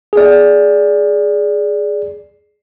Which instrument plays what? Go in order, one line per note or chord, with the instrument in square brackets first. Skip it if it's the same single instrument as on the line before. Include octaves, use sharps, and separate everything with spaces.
[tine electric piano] G#4 D5